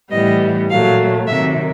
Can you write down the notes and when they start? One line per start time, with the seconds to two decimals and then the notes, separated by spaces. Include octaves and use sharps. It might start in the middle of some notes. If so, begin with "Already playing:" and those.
0.10 A2 E3 G3 B3 D#5
0.70 A#2 F#3 A3 F5
1.27 C3 D#3 F#3 E5